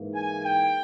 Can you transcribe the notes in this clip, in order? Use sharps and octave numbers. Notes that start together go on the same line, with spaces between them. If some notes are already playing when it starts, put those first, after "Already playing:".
Already playing: G#2 E3 A#3
G#5
G5